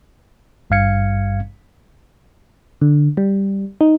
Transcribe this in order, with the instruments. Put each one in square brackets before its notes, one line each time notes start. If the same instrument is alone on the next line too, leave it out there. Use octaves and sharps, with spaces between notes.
[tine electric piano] G#1 G2 G3 F5 G#6 C#7
[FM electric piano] D3
G3
D#4